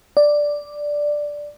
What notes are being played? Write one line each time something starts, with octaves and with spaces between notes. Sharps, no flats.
D5